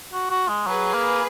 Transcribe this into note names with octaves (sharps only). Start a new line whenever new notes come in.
F#4
F#4
G#3
F#3 G#4 B4
A#3